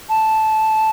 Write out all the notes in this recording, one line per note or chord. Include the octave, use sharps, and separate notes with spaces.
A5